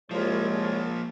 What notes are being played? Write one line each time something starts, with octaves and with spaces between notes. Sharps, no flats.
C2 F3 G#3 A#3 F4 C#5